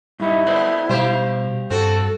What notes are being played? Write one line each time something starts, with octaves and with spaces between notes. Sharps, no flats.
G2 G3 D#4 E4
B3 A4 C5 D5
B2 G3 G4 C5 F5
G2 C4 F#4 A4